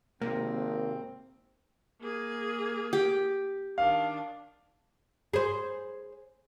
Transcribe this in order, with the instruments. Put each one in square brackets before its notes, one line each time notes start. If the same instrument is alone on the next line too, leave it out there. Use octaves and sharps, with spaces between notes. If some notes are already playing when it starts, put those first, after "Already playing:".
[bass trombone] G#1 [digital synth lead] C3 [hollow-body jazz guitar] A#3 [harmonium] C4
[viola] A#3 G#4
[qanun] G4
[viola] D#3 D4 [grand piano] F5
[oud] G#4 C5